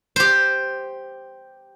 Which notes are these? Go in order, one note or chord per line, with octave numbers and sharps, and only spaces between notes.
G4 C5